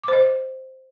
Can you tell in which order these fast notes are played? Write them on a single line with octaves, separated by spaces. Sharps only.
D6 C5 D#5